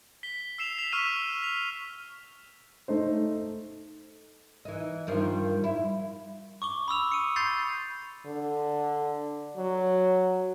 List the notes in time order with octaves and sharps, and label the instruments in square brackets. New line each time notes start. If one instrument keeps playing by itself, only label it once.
[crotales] B6 G7
E6 C7 E7 F7
B6 F7
C#6 E6 F6 B6 D#7
B6 F7
[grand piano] A3 D#4 C5
[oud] E3 D#4
G2 D#3 F3
E4
[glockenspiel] C#6 D6 G7
B5 D#6 E6 F7
C#7 D#7
C6 G6 A6 C7 F7
[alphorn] D3
F#3